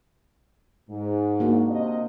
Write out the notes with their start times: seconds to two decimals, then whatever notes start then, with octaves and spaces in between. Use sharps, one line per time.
0.89 G#2
1.40 A#3 D4 F#4
1.71 C3 D#5